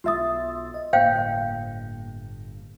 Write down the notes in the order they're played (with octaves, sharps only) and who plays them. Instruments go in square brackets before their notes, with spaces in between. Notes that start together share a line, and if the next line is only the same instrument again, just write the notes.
[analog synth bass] B1 [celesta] F4 E5 D#6 [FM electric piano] C6 E6 A6
[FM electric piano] D#5
[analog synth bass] G1 [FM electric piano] A2 A#3 [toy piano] C5 F5 G5 [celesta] G6